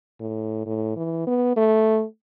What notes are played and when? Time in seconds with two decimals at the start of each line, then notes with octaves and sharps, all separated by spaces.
0.20 A2
0.66 A2
0.96 E3
1.27 B3
1.56 A3